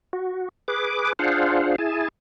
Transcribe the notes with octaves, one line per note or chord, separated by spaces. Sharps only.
F#4
G#4 B4 D6
D4 F4 G#4 C5 F5 F#5
E4 G#4 G#5 A5